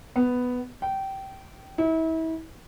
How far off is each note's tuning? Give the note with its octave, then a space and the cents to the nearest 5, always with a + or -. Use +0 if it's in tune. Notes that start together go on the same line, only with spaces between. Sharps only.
B3 +5
G5 -20
E4 -35